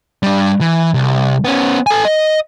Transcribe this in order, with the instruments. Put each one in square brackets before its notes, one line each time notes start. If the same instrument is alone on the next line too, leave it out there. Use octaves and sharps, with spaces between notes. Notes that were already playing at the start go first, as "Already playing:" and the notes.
[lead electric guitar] G3 D4
E3
C2
B3 C#4
A4 G#5
D#5